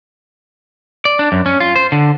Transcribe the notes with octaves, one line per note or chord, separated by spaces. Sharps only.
D5
D4
F#2
C#4
F4
C5
D3